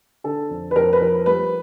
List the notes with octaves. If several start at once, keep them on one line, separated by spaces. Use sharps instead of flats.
D3 A4
F2
B4
F2 A#4
B4
F3 A#4
G3 B4